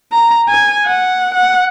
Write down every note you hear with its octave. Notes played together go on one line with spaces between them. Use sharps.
A#5
G#5
F#5
F#5